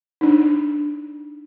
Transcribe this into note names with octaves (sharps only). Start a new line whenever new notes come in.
D4 D#4